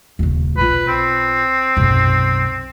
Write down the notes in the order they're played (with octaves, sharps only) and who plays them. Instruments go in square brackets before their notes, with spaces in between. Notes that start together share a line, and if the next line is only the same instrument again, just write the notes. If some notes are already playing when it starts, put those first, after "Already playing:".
[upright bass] D#1 C#3
[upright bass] B1 F4 [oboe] B4
[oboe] C4
[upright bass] B1 F#2